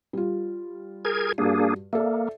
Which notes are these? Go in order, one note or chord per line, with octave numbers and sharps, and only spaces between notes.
G3 F4
G#4 A#4 G#6
G2 A#3 D4 F#4 G#4
A#3 A4 D5 E5